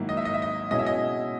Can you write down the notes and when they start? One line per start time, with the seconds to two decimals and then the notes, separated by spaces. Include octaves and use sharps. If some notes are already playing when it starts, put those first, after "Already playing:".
Already playing: G#2 D#3 F#3 A#3 E4
0.09 D#5
0.17 E5
0.25 D#5
0.34 E5
0.42 D#5
0.71 B2 G#3 C#4 E4 D#5
0.79 E5
0.86 D#5